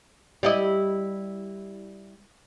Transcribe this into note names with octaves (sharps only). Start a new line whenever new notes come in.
G3 E4 D#5